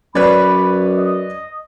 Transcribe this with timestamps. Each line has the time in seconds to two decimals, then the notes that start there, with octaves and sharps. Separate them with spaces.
0.15 F#2 B4 C#5 D5 B5
0.96 D#5